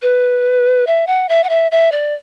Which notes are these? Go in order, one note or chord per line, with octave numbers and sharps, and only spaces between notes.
B4
E5
F#5
E5
F#5
E5
E5
D5